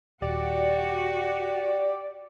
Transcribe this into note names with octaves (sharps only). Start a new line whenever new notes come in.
D#1 F#4 G4 D5